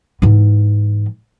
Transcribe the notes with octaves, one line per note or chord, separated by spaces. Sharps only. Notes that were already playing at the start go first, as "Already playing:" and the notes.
G#2 E3